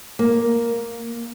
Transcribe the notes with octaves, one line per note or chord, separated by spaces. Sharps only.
A#3